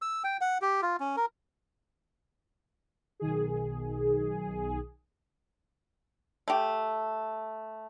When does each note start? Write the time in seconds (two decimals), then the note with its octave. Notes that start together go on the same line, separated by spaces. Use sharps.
0.02 E6
0.24 G5
0.41 F#5
0.62 G4
0.82 F4
1.00 C#4
1.17 A#4
3.20 B1 D#3 G#4
6.48 A3 G4